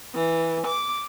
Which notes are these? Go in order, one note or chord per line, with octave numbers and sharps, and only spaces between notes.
E3
D6